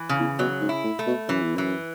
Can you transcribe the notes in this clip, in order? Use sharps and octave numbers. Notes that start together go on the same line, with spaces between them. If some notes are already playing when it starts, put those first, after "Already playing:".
Already playing: E3
C#3
E2
B2 F#3
G#2
E4
A2
A3
B2
F#2 E3
E2
F#2 E3